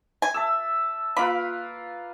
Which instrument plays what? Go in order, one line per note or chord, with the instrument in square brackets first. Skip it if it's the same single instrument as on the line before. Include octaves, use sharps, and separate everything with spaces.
[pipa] G#5
[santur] E5 A5 E6
[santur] A#3 F4 B4 [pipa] B5